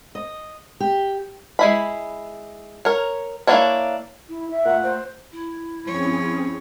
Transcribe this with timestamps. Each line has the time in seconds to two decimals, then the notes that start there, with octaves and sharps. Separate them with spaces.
0.15 D#5
0.80 G4
1.59 G#3 E4 B5
2.85 A#4 C#5
3.47 A#3 C4 D4 E4 C#5
4.29 E4
4.51 E5
4.66 A#2 A3 F#5
4.83 C5
5.32 E4
5.85 F3 C4 C#4 G#4 C#5